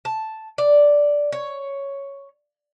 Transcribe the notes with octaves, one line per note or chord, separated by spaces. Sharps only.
A5
D5
C#5